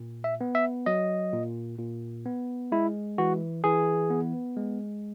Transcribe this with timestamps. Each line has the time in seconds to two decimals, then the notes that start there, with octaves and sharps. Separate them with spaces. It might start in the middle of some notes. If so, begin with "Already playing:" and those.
Already playing: A#2
0.24 E5
0.41 B3
0.55 E5
0.86 F#3 D#5
1.33 A#2
1.79 A#2
2.25 B3
2.72 G#3 E4
3.18 E3 F#4
3.64 E3 G#4
4.10 B3
4.56 G#3